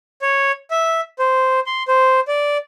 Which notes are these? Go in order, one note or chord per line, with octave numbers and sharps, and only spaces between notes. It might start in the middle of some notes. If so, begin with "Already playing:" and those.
C#5
E5
C5
C6
C5
D5